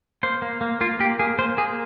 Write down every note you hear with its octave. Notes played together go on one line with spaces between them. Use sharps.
A#3 C5
A#3
A#3
A#3 F4
A#3 G4
A#3 G#4
A#3 C5
A#3 G#4